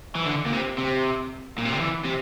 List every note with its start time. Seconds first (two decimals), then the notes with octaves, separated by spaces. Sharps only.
0.16 E3
0.26 D3
0.46 A#2
0.53 C3
0.78 C3
1.58 A#2
1.65 C3
1.73 D3
1.80 E3
2.05 C3